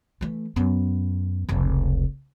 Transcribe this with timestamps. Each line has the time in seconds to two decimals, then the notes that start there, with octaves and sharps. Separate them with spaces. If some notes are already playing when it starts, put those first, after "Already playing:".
0.21 E3 A3
0.56 F#2 B3
1.49 F1 C#2